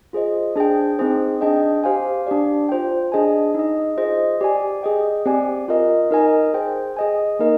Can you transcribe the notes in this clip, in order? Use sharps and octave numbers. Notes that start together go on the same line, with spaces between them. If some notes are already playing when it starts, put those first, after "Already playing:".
F4 G#4 C5 D#5
D4 G#4 C5 G5
C4 D#4 G#4 C5
D4 G#4 D#5 G5
G4 C5 F5 G#5
D4 G4 D5
F4 C5 G5
D4 G#4 D#5 G#5
D#4 G#4 D#5
F4 G#4 C5 D#5
G4 D5 G#5
G#4 D#5 G5
C4 G4 D5 G#5
F4 A#4 D#5
D#4 A#4 D#5 G#5
G#4 C5 G5
G#4 D#5 G#5
A#3 D#4 A#4 D#5